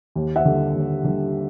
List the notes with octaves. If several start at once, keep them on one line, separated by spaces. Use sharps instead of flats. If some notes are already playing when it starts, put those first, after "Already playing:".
D#2
E5 F#5
D3 G3
D#2
D3 G3